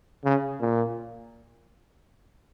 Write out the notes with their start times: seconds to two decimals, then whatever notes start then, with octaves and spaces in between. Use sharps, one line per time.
0.24 C#3
0.61 A#2